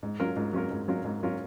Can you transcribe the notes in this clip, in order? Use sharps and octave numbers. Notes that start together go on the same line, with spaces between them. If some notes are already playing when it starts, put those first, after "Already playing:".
G#2
F#3 C#4 F4 A#4
G#2
F#3 C#4 F4 A#4
G#2
F#3 C#4 F4 A#4
G#2
F#3 C#4 F4 A#4